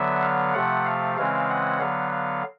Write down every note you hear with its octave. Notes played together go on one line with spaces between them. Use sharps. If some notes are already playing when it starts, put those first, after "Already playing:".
Already playing: D3 F#3 B3 E5
F5
C3 F3 A3 F#5
F5
C#3 E3 G#3 C4 F5
F#5
D3 F#3 B3 F5
F5